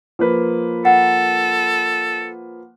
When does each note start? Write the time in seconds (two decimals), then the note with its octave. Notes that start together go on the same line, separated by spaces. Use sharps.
0.19 F3 A#3 B4
0.85 A4 F#5